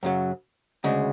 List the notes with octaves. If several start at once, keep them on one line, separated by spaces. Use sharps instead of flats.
F#2 C#3 F#3
D2 C#3 G#3